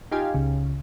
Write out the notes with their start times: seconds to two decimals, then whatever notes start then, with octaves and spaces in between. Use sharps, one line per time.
0.11 D#4 F4 G4 F5 G#5
0.34 C#2 C#3